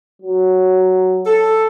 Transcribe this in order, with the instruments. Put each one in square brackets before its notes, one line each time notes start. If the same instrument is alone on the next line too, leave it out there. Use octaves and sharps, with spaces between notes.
[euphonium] F#3
[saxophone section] A4